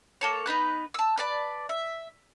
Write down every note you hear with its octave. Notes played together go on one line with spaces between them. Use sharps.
A#3 A4 C#5
B3 D#4 B4 F#6
A5 E6
B4 D5 A5
E5